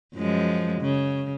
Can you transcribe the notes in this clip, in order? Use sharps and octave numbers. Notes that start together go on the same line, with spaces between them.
F#2 F3 G#3
C#3